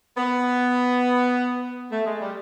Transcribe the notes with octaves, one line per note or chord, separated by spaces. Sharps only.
B3
A3
G#3
G3